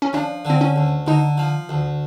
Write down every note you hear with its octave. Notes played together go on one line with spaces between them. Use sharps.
C#4
F3 D4
D3 C4
C#4
D2
D3 D#4
F3
D2